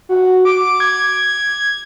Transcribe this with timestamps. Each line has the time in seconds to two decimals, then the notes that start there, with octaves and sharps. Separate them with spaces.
0.09 F#4
0.45 D6
0.80 G#6